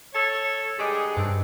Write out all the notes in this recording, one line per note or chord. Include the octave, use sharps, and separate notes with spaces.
A4 C#5
G2 G#3 G#4 D6 F#6 B6
G2 D#3 C4 D4